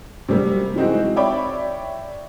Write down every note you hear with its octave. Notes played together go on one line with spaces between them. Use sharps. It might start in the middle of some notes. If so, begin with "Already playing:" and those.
C3 F#3 G3 A#3
E3 G#3 C4 D#4 F#4
C#5 D5 E5 G5 B5 D6